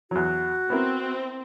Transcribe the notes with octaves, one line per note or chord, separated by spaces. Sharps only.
E2 F#3 F#4
B3 C4 E4 A#4